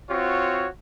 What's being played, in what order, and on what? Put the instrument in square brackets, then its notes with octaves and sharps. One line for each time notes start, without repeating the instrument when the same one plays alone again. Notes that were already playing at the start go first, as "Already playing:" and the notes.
[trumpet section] C4 F4 F#4 C#5